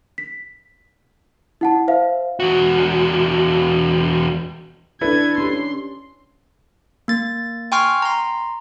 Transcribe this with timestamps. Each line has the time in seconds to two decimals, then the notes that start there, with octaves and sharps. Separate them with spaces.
0.18 B6
1.61 E4 F#5 A5
1.88 C5 E5 F5
2.40 E2 F#4
5.01 D4 E4 A4 B4 D5 G#6
5.38 C#4 G4 C6
7.08 A#3 A6
7.72 G5 G#5 C6 C#6 F6
8.02 A#5 C6